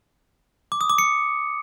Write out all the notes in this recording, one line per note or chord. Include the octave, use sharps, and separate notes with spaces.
D6
D#6
D6
C#7